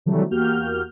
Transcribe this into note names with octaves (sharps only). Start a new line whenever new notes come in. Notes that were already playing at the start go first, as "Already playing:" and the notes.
C3 D#3 E3 F#3 G3 A3
E2 A#3 F#4 G4 F6 G6